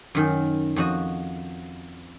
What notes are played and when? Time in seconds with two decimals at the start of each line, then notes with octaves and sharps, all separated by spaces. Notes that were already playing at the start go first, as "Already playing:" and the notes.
0.15 F#2 D#3
0.76 F2 F#4 D#5